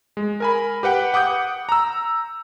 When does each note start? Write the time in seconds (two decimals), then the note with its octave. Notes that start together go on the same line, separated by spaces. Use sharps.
0.17 G#3
0.40 A#4 G#5 B5
0.83 G4 B4 F#5 G5
1.14 F#5 D6 D#6 G6
1.69 A#5 E6